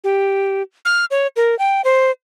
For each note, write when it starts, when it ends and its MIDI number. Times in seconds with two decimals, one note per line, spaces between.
0.04 0.62 67
0.85 1.05 89
1.11 1.27 73
1.36 1.58 70
1.59 1.82 79
1.84 2.11 72